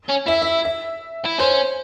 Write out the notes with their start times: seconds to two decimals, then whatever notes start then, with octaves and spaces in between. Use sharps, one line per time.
0.09 C#4
0.27 E4 E5
0.42 E5
0.65 E5
1.26 E4
1.39 C#4 C5